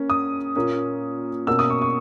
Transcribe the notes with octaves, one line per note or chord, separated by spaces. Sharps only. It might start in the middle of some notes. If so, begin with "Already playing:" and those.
Already playing: A#3 C#4
D#6
A#2 A#3 C#4
B2 A#3 C#4 E6
D#6
C#6
C#6